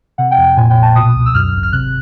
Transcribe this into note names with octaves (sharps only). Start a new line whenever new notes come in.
C3 F#5
G5
F2
G5
A#2 G#5
G5
A#1
A5
B2 D#6
C#2
E6
F#2 F6
G#1
F6
C3 F#6